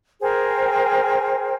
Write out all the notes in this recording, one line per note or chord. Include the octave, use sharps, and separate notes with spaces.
G#4 A#4 C5 G5